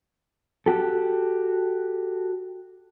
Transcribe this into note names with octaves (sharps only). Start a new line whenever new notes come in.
F#4 G4 A4